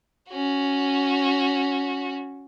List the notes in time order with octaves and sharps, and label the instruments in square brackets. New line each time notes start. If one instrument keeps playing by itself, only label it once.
[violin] C#4 F#4